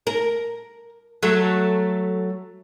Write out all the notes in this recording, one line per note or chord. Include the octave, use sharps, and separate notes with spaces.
A#4
F#3 A3